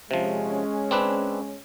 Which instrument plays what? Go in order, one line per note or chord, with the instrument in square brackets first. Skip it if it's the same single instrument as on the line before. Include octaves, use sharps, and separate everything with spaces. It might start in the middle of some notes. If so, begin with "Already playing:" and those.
[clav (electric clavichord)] C3 F3 [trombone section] G#3 C#4
[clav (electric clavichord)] C4 D4 B4